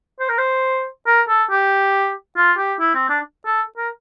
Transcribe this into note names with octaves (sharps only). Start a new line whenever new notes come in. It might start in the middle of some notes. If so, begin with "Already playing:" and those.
C5
A#4
C5
A#4
A4
G4
F4
G4
E4
C4
D4
A4
A#4